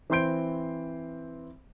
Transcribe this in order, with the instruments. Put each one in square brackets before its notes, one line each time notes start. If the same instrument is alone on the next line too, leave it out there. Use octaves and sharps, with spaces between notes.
[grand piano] E3 C4 C5 C6 G6 D7